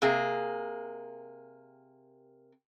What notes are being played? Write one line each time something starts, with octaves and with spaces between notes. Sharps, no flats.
C3 A#3 G#4